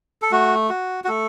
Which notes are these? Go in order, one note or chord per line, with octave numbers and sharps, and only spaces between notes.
A4
A3 F#4
F#4
F#4
A3 A4